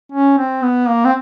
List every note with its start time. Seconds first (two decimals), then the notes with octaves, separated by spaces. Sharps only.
0.12 C#4
0.38 C4
0.62 B3
0.88 A#3
1.05 C4